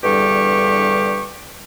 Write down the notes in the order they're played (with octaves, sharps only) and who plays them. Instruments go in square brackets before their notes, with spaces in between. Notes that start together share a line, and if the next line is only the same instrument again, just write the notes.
[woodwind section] E2 G2 D3 G3 G4 C#6